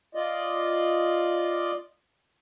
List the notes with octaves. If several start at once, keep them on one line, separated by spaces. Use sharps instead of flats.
F4 D5 D#5